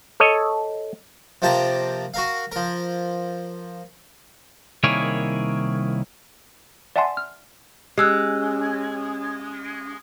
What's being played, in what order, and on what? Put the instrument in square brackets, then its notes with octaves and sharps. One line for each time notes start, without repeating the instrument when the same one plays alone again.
[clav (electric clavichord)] A4 C#5 D#5
[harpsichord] C3 F3 A#3 G5 A5 A#5
F#4 A#4 F5
F3 A#4
[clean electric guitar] C2 D#3 A#3 E4 G#4 C#5
[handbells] D5 E5 F#5 G#5 A5 C6
F6
[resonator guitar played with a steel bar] G#3 [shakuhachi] C#4 [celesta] G4 E6 F#6